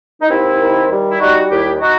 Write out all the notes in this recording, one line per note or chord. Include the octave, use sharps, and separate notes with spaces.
D#4
D#2 C4 E4
D#3
G3
E4
G3 D#4 F#4
D#2 E4 G4
D#4 F#4